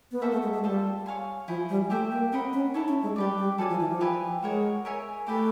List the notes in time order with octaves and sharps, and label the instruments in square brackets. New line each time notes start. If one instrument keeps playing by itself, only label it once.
[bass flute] B3
[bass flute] A#3 [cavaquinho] F#4 A4 C5 E5
[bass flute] A3
G#3
G#3
[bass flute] G3 [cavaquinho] F4 A4 C5
[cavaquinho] C#5 F5 G#5 C6
[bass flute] F3 [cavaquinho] E4 G#4 C5
[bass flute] G3
[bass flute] A3 [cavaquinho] G4 C5 E5 G5
[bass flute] A#3
[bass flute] C4 [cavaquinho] A#4 D#5 F#5 B5
[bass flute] C#4
[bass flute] D#4 [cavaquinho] E4 A4 C#5
[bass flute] C#4
G#3
[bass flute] G3 [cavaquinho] G4 B4 D5
[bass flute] G3
[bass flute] F#3 [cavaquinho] A4 D5 F5 G#5
[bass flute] F3
E3
F3
[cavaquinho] G4 B4 E5 G#5
[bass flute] G#3 [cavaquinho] F#4 A#4 C#5
[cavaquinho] A#4 C#5 E5 G#5
[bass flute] A3 [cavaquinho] E4 G4 B4 D5